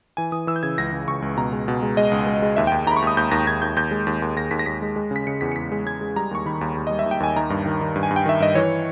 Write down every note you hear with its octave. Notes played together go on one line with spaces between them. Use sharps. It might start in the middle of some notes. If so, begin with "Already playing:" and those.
E3 G#5
E3 D#6
E3 E6
G6
C#3 G#6
C#2 A#6
C#2
C#2 C#6
C#2
B2 A#5
G#3
B2
G#3
G#3 D#5
C#2
G#3
G#3
D#2 E5
G5
D#2
D#2 A#5
B5
C#6
D#2 D#6
D#2 G6
D#2 A#6
D#2 G#6
D#2 G6
D#2 G6
G#3
D#2
D#2
D#2 A#6
D#2 B6
A#6
D#2 B6
G#3
G#3
C#3 B6
C#3 C#7
E2 B6
C#7
E2 B6
G#3
G#3 G#6
G#3
G3 A#5
D#2 C#6
D#3 B5
D#2
D#2
G3 D#5
E5
D#2
G5
D#2 G#5
D#3 A#5
G2
D#3
D#3
G2
G#5
G2
G5
D#3 E5
G2 D#5
E3 C#5